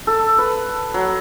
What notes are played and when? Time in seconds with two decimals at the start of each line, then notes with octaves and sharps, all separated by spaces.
0.07 A4
0.38 B4
0.94 F#3